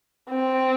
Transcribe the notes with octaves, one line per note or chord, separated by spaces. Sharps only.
C4